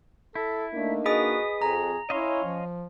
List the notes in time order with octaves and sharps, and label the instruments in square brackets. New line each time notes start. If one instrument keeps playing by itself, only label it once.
[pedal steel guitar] E4 [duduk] A4
[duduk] A3 [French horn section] A#3 D4 D#4
[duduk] F#4 [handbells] G#4 D#5 D#6 [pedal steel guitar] B4
[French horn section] F2 [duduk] G#4 [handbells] A#5
[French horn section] C#4 C#5 [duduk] E4 [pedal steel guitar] D#5 F5 C6
[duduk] F3